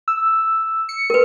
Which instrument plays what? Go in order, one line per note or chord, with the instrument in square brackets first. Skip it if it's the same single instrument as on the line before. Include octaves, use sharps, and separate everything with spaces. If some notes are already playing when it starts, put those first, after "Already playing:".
[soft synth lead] E6
C#7
[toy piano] A#4 B4